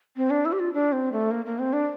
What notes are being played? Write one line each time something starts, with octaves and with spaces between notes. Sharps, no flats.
C4
D4
E4
G4
F4
D4
C4
A3
A#3
A#3
C4
D4